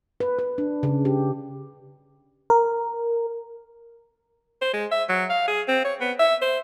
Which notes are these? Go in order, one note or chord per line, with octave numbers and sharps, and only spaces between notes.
B4
B4
D4
C#3
G4
A#4
C5
G#3
E5
F#3
F5
G#4
C4
C#5
B3
E5
C5